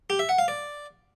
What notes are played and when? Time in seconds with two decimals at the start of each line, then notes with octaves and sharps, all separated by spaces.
0.10 G4
0.19 E5
0.29 F#5
0.39 F5
0.48 D5